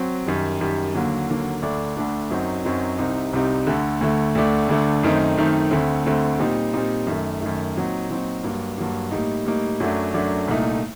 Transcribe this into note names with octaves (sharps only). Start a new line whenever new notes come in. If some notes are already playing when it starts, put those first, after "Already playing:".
Already playing: F#3 C4
F#2 D#3 G3
F#2 D#3 G3
D#2 D3 F#3 A#3
D#2 D3 F#3 A#3
D2 D3 A3 D4
D2 D3 A3 D4
F#2 F#3 C4 D#4
F#2 F#3 C4 D#4
C2 C3 G3 C4 D#4
C2 C3 G3 C4 D#4
D2 D3 A3
D2 D3 A3
D2 D3 A3 D4
D2 D3 A3 D4
F#2 D#3 A3 C4 D#4
F#2 D#3 A3 C4 D#4
D2 D3 A3 C4
D2 D3 A3 C4
A#2 G3 C4 D#4
A#2 G3 C4 D#4
F#2 D#3 A3
F#2 D#3 A3
A#2 F#3 C4 D#4
A#2 F#3 C4 D#4
G2 F#3 A#3
G2 F#3 A#3
A2 G3 A#3 D#4
A2 G3 A#3 D#4
F#2 F#3 A3 D4
F#2 F#3 A3 D4
C2 A#2 A3 D#4